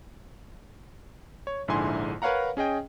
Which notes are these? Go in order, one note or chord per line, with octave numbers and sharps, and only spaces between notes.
C#5
A#1 G#2 D3 E4 G#5 C6
A#4 B4 C#5 F5 F#5 A#5
C#4 G#4 D#5 G5